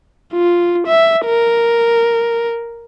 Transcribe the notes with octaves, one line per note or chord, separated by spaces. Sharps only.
F4
E5
A#4